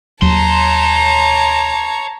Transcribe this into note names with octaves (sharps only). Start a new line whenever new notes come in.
D#2 F#3 C#5 A5 A#5 C6